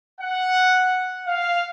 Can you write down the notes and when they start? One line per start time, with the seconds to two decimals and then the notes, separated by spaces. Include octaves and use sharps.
0.21 F#5
1.27 F5